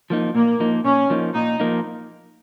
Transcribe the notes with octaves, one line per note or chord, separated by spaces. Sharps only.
F3 A#3 D#4
A#2 A#3
F3 A#3 D#4
A#2 C#4
F3 A#3 D#4
A#2 D#4
F3 A#3 D#4